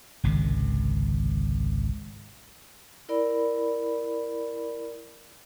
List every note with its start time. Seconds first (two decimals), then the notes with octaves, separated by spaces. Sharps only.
0.24 G#1 C#2 C3 D#3
3.09 E4 A#4 D5 B5